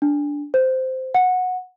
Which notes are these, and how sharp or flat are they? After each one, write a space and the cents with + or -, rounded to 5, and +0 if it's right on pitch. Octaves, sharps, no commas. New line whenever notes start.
D4 -10
C5 -10
F#5 -15